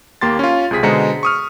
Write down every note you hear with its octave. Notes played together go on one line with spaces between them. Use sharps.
D#2 A#3 G4 C6 A6
C#4 F4
C#2 C3 G#4 B6
B2 D3 G#3 C5 A#5 C#7
C#6 D#6 F6